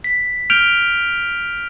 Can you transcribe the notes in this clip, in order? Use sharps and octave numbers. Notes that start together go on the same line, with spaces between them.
B6
F6 G6 D7 F7 G7